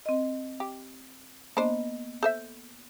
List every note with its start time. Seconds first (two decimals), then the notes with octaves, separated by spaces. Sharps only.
0.06 C4 D#5
0.60 G4
1.57 A#3 B3 D4 C5 D#5
2.23 A4 C5 E5 G6